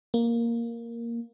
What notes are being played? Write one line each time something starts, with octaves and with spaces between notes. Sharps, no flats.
A#3